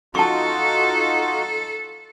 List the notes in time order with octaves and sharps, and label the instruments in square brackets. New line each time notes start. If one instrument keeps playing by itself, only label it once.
[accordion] D#4 F4 F#4 [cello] A4 [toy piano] A5 C#6